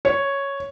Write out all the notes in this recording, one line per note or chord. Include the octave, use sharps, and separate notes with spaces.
C#5